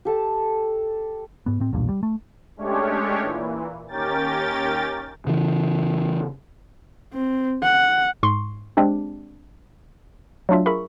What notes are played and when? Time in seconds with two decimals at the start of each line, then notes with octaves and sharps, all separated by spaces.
0.05 G4 A4 A5
1.46 G#2 B3
1.60 A2 C4
1.73 B1 E2 G2 A#2
1.89 G3
2.03 A3
2.57 G#3 A3 C#4 D4 G4 C#5
3.22 A#2 E3
3.88 D#2 C#4 G4 A#4 G5 A6
5.27 C#3 E3
7.13 C4
7.63 F#5
8.23 G#2 C6 C#6
8.77 G#3 C4 D4 G4
10.49 F#3 A3 D4 F4 E5
10.66 F4 G#4 A#4 E5 B5 C#6